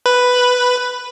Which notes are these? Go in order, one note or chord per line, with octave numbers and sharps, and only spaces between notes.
B4